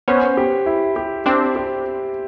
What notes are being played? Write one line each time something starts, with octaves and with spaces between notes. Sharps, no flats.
B3 C#4 C5
G4
E4
G4
C4 D4 C5
G4